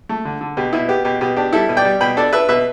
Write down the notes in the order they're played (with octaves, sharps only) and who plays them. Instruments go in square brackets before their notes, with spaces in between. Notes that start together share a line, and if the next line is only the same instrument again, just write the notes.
[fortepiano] A3
D3
D3
B2 G4
B2 E4
B3 G4
B2 G4
B2 G4
D4 G4
G3 E4 A4
B2
D5 G5
G3
B2 G5 B5
D4 A4 D5
D4 B4 E5
B2 B4 E5